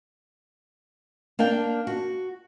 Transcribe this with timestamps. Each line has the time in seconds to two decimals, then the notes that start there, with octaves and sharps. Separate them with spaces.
1.39 A#3 D4 F5 G5
1.87 F#4